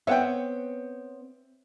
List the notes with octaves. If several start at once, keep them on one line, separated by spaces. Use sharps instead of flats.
B3 C4 C#5 E5 F#5 G5